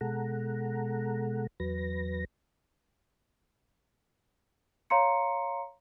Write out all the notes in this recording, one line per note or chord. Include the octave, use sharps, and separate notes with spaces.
B2 G#3 A4 F#5 A#5
E2 F#3 B4 A#6
C#5 F5 A#5 C6 C#7